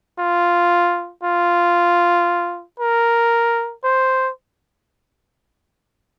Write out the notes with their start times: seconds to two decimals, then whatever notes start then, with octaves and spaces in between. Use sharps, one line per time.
0.19 F4
1.23 F4
2.80 A#4
3.84 C5